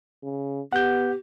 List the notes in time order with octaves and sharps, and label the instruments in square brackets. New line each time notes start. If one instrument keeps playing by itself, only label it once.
[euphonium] C#3
[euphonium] B3 [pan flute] G4 [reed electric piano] F#5 G6